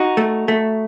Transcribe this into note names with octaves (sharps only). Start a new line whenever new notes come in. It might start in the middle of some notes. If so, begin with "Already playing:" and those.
Already playing: D#4 F#4
A3
A3